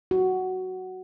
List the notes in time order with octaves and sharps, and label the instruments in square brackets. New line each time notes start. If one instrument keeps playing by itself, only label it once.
[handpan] F#4